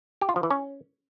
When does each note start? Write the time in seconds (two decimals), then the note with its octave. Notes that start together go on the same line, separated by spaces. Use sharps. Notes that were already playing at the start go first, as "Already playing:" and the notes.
0.21 G4
0.29 F4
0.36 F3
0.43 E3
0.50 C#4